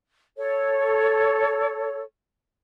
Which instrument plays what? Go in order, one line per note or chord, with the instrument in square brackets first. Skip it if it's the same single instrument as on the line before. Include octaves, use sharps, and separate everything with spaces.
[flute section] A4 C#5